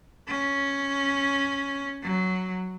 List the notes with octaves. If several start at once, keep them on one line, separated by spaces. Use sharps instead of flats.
C#4
F#3